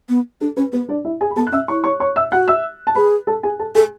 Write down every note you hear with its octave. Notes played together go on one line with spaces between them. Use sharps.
B3
D4 A4
C#4 B4
B3 B4
D4 D5
E4 E5
G#4 G#5
B5
B3 A4 A5
F#6
C#4 E5 E6
E4 C#5 C#6
C#5 C#6
C#5 C#6
E5 E6
F#4 F#5 F#6
E5 E6
A5
G#4 B4 B5
A4 A5
G#4 G#5
A4 A5
G#4 A4 G#5